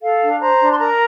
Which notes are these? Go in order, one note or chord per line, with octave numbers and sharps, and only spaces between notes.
A4 F5
D4
C5 A#5
D4
C6
A#4 A#5